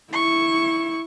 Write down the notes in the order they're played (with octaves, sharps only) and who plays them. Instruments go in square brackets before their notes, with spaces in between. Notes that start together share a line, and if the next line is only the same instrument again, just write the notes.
[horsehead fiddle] E4 [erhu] C#6